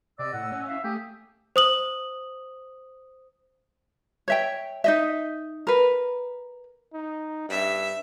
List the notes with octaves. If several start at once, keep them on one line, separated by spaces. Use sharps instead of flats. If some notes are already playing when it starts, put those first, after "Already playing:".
C3 D5 D#5 E6
A2 F#5
C#4
E4 E5 F5
A3 G4 E5 G#5 D#6
C5 D#6 F#7
C#5 E5 G5
D#4 D#5 E5
A#4 B4
D#4
G2 E5